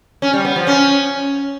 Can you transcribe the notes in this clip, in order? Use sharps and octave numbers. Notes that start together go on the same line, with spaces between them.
C#4
G3
B3
F3
C#4